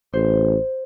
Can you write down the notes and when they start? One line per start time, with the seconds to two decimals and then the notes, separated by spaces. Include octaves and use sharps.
0.13 A1 C5